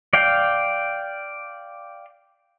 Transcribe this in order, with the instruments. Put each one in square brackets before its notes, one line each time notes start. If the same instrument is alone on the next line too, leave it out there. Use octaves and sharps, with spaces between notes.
[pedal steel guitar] D5 F5 G5